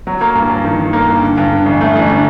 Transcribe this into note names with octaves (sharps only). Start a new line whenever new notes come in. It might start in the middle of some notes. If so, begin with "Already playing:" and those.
F#3
A#3
G2
G2
D#3
D#3
A#3
G2
D3
G2
D3
A1
A3
A1
D3